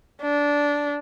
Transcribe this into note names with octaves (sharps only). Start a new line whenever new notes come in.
D4